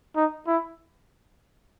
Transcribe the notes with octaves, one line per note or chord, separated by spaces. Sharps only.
D#4
E4